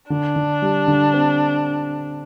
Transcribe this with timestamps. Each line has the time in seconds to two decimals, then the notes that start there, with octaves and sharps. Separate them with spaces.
0.10 D3 D4
0.36 D3
0.62 G3
0.88 D3
1.14 C4